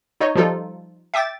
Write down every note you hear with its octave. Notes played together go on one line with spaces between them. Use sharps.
D#4 C#5 D#5
F3 G3 D#4 F4 A4
E5 G5 D6 A6